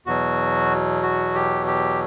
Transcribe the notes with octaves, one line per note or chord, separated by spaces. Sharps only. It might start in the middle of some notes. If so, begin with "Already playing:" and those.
E2 B2 F#3 F#4
F#4
G4
G4